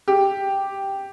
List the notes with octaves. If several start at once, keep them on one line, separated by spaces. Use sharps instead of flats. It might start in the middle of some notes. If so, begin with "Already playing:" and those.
G4